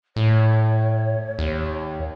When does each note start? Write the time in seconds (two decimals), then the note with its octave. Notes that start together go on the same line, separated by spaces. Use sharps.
0.16 A2 C#5
1.39 D#2